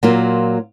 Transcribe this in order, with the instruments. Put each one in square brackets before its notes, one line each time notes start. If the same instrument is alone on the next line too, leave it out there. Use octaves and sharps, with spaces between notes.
[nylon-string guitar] A#2 F#3 A#3 F4